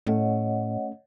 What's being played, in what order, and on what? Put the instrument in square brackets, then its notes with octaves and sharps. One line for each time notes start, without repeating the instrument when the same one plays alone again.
[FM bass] A2 [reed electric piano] A3 C#4 [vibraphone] C#5 D#5 F#5